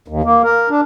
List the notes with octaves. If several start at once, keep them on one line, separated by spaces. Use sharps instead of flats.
D#2
A#3
A#4
D4